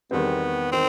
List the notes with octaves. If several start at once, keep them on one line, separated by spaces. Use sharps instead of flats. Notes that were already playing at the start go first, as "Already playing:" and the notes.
E2 D#3 G3 B3 C4
D#3 C4